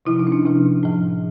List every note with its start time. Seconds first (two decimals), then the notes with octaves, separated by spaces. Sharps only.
0.05 C3 F3 E4
0.19 D#4
0.27 C#4
0.32 D4
0.45 C3 F3
0.83 A2 F3